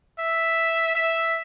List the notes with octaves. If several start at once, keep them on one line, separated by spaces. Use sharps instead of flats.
E5
E5